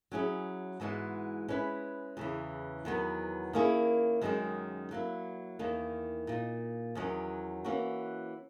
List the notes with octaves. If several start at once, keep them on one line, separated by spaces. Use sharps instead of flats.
F#3 C#4 E4 G#4
G#2 E3 G#3 B3 F#4
G#3 C#4 E4 B4
E2 C#3 E3
E2 D#3 F#3 B3
D#3 A#3 C#4 E4 G#4
F#2 D#3 G#3 C#4 G#4
F#3 A#3 E4
E2 D#3 A#3 D#4
A#2 A#3 D#4
E2 D#3 F#3 C#4
E3 A#3 C#4 F#4